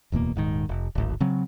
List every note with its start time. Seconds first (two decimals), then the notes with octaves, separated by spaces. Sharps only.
0.12 D1 E2 B2 A#3
0.36 D#1 G#2 D#3
0.69 F1
0.95 D1 G#1
1.20 C#3 F#3 C4